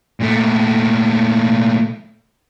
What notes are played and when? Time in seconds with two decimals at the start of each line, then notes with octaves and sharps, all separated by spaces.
0.20 A#2 A3